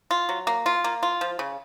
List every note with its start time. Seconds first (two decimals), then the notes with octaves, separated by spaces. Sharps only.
0.11 F4
0.29 F#3
0.47 A#3
0.66 F4
0.84 A#3
1.03 F4
1.21 F3
1.39 C#3